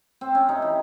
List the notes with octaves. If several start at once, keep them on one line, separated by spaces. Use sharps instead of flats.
C4
C#4
C3 D#4
E3